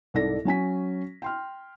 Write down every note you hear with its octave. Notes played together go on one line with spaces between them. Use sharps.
C2 G#2 A4 D5 A#6
F#3 C#4 G#5 B6
G5 C6 F6